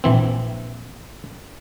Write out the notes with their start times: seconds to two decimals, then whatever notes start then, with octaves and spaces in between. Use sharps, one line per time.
0.04 A#1 E3 C4